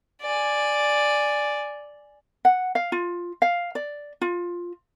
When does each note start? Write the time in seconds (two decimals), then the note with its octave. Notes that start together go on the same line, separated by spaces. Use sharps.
0.22 D5 G#5
2.45 F#5
2.75 F5
2.92 F4
3.42 F5
3.75 D5
4.21 F4